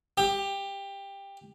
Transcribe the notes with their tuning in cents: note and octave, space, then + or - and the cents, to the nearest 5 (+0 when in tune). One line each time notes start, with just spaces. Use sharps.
G4 +15